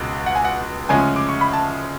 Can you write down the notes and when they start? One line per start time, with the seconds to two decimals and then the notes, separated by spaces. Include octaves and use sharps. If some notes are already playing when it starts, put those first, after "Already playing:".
Already playing: C#2 B2 G#3
0.26 F#5
0.35 G#5
0.45 F#5
0.89 D2 C#3 F3 G#3 C#4 G#5
1.16 D6
1.29 C#6
1.41 B5
1.53 A5